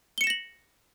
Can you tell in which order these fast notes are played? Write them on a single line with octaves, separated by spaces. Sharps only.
G7 C#7 E7 A#6 F#7